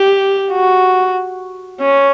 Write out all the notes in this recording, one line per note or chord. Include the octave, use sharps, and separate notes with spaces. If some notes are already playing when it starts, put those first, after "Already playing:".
Already playing: G4
F#4
C#4